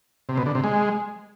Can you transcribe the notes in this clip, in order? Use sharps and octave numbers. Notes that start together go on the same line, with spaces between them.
C3
B2
D3
C3
G#3